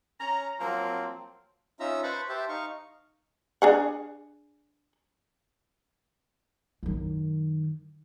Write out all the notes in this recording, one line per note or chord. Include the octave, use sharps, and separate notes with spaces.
C#4 A#5
F3 F#3 A#3 C4
C#4 D#4 F4 E5 A#5 E6
B4 C5 A5 B5 C#6
G4 C5 E5 A5
D#4 F5 C#6
D4 G#4 F#5
F#2 D#3